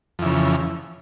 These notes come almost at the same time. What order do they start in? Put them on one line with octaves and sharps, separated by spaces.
F2 E3 C#3